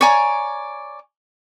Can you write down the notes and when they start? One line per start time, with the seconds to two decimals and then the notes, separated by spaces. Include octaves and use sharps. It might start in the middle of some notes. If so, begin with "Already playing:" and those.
0.01 C#5 D5 G#5 A#5